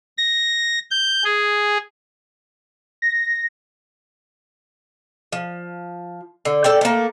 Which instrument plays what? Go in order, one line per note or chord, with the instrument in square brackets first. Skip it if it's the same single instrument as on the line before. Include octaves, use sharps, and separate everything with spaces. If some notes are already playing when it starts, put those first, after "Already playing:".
[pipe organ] A#6
G6
G#4
[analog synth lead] A#6
[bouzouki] F3
D3
A4 D5 G5
A3 A#3